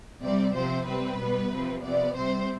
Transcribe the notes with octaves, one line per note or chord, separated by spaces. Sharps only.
C3 G3 C4 D5
C3 F3 C4 C5
C3 G3 C4 B4
B2 G3 B3
C3 F3 C4
C3 F3 B3 D5
C3 G3 C4 C5